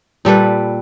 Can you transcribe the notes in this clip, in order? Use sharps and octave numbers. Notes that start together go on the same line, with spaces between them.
A#2 G3 A4 B4